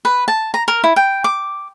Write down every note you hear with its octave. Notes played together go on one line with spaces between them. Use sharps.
B4
A5
A#5
A#4
E4
G5
D6